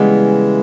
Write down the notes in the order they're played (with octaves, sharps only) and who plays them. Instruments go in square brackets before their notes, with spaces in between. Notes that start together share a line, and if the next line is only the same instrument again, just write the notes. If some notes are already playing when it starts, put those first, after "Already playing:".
Already playing: [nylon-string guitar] C#3 E3 G3 B3 [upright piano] G#3